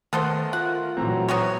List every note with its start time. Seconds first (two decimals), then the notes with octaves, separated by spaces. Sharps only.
0.13 D#3 A3 B3 A4 A#4 C5
0.53 F4 F#5
0.97 A#2 E3 F#3 A3 C4 A#5
1.29 B3 F#4 C#5